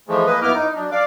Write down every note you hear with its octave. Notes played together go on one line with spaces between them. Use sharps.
E3 F3 G#3 A3
A#3 B4 D#5
F#2 B3 E4 D6 F6
D#4
F#2 D4
D5 F5 D6